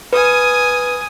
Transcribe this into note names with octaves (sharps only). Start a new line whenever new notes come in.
B4 G#5 D#6